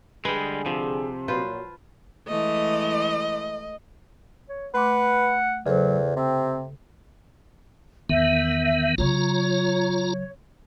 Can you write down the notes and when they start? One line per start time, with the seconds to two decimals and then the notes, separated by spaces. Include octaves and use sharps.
0.25 D3 G3 G#3 G#4 B4
0.66 C3 F3
1.28 A#2 F#3 F4 B4 C5
2.28 E3 G#3 A3 D#5
4.49 C#5
4.74 A3 B4 F#5 C6 D6
5.66 E2 C#3 F#3 A4 C5
6.16 C3 C4
8.09 E2 D#3 B3 E5
8.98 C#3 F#3 F4 C#5 A#5